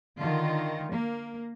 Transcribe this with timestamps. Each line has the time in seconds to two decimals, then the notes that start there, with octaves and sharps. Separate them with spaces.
0.18 D3 D#3 F4
0.91 A#3